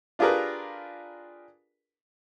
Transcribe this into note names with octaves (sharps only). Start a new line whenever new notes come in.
D4 F4 G4 G#4 A#4 B4